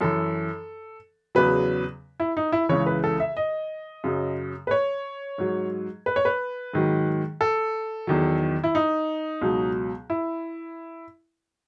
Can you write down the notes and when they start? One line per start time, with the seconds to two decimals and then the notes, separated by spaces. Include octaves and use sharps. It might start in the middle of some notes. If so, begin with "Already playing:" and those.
0.01 F#2 E3 A4
1.35 E2 C#3 F#3 B4
2.20 E4
2.37 D#4
2.52 E4
2.69 C#2 C#3 E3 C#5
2.86 B4
3.04 A4
3.20 E5
3.37 D#5
4.04 F#2 C#3 F#3
4.67 B4
4.71 C#5
5.38 G#2 F#3
6.06 B4
6.16 C#5
6.25 B4
6.74 G#2 D#3 F#3
7.41 A4
8.07 E2 D#3 F#3
8.64 E4
8.75 D#4
9.41 C#2 B2 F#3
10.10 E4